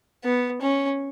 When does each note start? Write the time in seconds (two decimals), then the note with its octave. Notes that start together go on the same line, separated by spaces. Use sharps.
0.24 B3
0.62 C#4